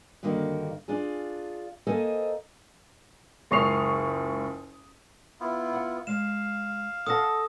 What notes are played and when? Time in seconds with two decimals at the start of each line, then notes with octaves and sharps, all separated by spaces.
0.23 G2 D3 D#3 A#3 F#4
0.88 D4 F4 G#4
1.87 A#3 A4 C5 D#5 G#5
3.51 F#1 C#2 C#6 D#6 C7 F7
5.40 B3 E4 F4
5.73 F#5
6.07 G#3 F5 E7
7.07 A4 F#5 A5 D#6 A#6